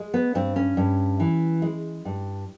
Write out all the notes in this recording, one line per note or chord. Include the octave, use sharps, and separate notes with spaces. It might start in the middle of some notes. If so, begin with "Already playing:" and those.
Already playing: G#3
B3
G2 C4
C#4
G2
E3
G#3
G2